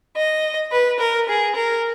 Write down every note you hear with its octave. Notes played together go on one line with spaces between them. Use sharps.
D#5
B4
A#4
G#4
A#4